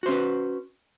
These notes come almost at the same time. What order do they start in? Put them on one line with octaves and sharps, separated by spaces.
F#4 C5 C#4 B4